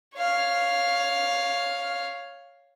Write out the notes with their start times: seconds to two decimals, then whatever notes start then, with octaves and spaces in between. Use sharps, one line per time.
0.16 C#5 F5